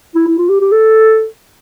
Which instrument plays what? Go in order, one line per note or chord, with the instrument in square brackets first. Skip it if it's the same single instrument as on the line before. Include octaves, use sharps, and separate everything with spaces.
[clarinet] E4
E4
F4
G4
G4
A4